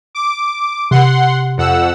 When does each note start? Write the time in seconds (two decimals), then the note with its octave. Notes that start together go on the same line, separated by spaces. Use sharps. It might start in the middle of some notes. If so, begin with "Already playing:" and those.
0.15 D6
0.91 C3 F#5 C6
1.57 F2 F#5 E6